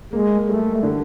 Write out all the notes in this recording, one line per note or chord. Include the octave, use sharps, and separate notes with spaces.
G#3 A#3
G3 A3
D3